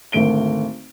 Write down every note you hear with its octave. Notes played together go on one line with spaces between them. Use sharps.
G#1 D2 A3 D7 G7